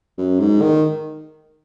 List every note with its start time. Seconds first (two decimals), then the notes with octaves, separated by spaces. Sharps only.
0.18 F#2
0.39 G#2
0.61 D#3